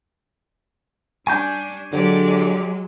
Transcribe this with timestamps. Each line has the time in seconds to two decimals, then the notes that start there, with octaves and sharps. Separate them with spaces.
1.27 G3 D4 G#5 C#6 G6
1.93 D3 F#3 G#3 G4 D5